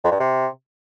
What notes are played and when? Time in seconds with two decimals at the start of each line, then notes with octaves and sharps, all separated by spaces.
0.04 F2
0.12 G2
0.20 C3